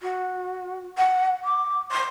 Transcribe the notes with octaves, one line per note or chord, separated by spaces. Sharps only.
F#4
F#5
D6
C6